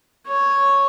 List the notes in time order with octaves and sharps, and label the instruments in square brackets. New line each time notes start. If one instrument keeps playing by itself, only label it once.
[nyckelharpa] C#5